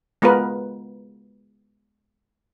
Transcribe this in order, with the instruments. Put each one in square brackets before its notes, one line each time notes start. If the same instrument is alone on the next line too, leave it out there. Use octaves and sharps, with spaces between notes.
[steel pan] G#3 B3 F4 A#4 B4